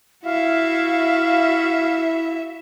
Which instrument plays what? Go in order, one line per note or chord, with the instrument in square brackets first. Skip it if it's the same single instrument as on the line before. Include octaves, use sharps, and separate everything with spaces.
[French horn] E4 [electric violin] F#4 E5 [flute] F5